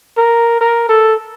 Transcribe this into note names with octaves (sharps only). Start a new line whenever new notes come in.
A#4
A#4
A4